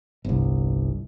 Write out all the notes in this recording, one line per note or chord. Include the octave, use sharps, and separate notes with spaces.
G1 C2